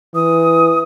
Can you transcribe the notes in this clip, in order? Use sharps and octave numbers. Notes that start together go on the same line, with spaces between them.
E3 D#6